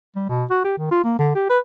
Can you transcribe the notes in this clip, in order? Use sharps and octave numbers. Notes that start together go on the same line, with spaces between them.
G3
B2
F#4
G4
D#3
F4
A#3
D3
G4
B4